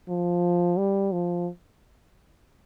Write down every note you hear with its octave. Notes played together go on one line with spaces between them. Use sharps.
F3
G3
F3